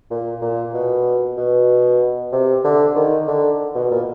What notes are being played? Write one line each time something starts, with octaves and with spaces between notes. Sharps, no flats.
A#2
A#2
B2
B2
C3
D3
D#3
D3
B2
A#2